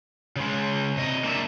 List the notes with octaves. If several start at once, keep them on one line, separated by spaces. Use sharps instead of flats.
C#3 G#3
C3 D#5
A#3 D4 E5